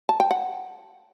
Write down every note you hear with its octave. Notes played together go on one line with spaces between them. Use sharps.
A5
G5
F#5